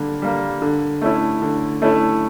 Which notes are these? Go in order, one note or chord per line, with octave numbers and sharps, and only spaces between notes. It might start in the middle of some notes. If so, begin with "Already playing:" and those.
Already playing: D3 G3 A#3
G3 A#3
D3
A3 C#4 E4
D3
A3 C#4 E4